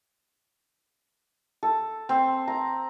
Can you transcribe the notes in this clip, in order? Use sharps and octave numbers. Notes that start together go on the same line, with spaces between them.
A4
C4
A#5